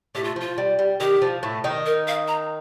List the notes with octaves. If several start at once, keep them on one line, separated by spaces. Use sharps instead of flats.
A2 A3 G4
F4
F3 F4
G3
G3
D#3 G4
F3
A2 A3
D#3 D#4
A#4
F5
A#5